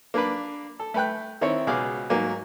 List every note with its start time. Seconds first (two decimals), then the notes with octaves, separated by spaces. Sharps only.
0.14 A#3 D4 B4
0.79 A4
0.94 A3 B4 G5 F#6
1.41 D#3 C4 E4 C5 C#5
1.67 C#2 B2 G#4 F5 D6
2.10 G#2 F#3 A#3 G#5